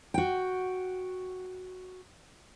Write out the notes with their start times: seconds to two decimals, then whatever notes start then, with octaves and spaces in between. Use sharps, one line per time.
0.14 F#4 G5